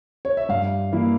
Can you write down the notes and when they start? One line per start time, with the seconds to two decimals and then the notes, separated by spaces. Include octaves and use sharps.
0.25 C#5
0.37 E5
0.49 G2 F5
0.92 E3 A#3 E4